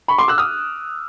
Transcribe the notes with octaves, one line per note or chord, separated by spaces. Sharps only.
B5 C#6
C6 D6
E6 F#6
D#6 F6